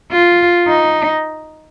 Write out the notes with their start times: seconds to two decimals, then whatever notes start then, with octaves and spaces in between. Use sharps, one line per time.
0.11 F4
0.67 D#4